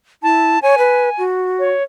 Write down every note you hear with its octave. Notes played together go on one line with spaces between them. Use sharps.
E4 A5
C#5 G#5
B4
F#4
C#5